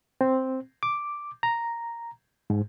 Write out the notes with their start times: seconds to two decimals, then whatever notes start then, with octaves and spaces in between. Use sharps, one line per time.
0.21 C4
0.83 D6
1.43 A#5
2.50 G#2